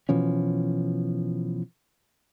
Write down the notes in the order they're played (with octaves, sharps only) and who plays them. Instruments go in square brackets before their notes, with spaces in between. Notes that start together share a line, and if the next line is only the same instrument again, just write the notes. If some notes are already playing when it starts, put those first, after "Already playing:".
[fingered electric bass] B2 E3 F3 C#4